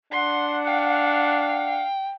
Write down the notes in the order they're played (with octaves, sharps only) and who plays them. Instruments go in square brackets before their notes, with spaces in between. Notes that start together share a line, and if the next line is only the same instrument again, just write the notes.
[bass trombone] D4 [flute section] F#5 [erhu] C6
[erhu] F5 [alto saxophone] G5